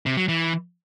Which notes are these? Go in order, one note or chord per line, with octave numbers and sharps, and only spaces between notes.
C3
F#3
E3